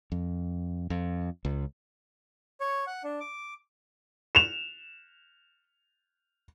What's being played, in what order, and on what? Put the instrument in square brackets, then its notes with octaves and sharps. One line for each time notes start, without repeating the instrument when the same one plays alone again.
[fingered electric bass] F2
F2
C#2
[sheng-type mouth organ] C#5
F#5
D4
D6
[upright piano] E7 F7